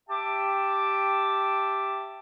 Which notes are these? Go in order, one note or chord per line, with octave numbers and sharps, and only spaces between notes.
G4 E5 G5 A5 D6